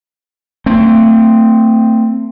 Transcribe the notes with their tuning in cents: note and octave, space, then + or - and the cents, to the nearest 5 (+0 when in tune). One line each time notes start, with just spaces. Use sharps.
A3 +35 C4 +0